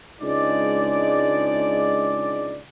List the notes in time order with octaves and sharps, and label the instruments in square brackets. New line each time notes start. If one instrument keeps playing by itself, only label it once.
[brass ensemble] C#2 G#3 D4 D#4 D5